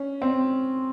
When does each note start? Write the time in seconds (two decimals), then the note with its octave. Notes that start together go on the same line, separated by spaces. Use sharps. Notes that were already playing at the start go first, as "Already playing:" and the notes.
Already playing: C#4
0.22 C4